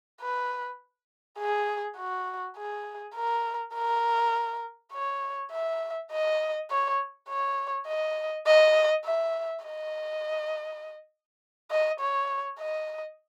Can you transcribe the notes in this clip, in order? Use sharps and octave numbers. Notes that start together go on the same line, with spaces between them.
B4
G#4
F#4
G#4
A#4
A#4
C#5
E5
D#5
C#5
C#5
D#5
D#5
E5
D#5
D#5
C#5
D#5